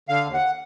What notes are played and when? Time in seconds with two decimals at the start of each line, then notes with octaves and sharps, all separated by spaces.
0.09 D3 F5
0.26 D#2
0.34 F#5